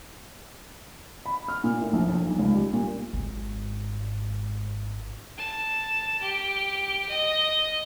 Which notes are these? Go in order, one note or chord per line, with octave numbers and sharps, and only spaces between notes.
B5
F6
A#2
A2
A#1
F2
B1
C#2
G3
A#2
G#1 G#2
A5
G4
D#5